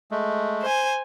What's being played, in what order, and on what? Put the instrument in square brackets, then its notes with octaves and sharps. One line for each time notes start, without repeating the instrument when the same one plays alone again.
[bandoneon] G#3 A3
[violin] C5 G#5